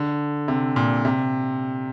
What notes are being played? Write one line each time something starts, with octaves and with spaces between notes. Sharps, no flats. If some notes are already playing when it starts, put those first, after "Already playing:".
Already playing: D3
C3
A#2
C3